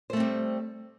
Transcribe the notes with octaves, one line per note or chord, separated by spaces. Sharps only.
G3 A3 C4 C5